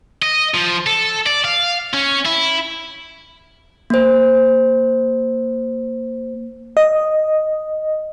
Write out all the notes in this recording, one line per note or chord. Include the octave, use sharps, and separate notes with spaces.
D#5
F3
A4
D5
F5
C#4
E4
A#3 C5
D#5